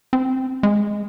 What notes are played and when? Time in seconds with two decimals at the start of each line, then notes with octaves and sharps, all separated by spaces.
0.13 C4
0.63 G#3